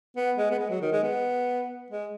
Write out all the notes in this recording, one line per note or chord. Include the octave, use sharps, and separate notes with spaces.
B3
G#3
B3
G#3
F#3
D#3
G#3
B3
G#3